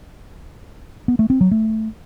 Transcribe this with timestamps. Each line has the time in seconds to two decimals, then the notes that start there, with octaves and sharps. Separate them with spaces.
1.08 B3
1.19 A3
1.30 C4
1.41 F#3
1.51 A3